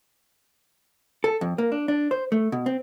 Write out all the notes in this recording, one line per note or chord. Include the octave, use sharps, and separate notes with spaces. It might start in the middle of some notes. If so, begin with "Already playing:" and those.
A4
F2
A#3
D4
D4
C5
A3
B2
C4